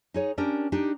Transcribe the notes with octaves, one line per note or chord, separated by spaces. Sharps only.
D#4 G#4 C#5
C#4 D4 G4 A#4
D4 D#4 G4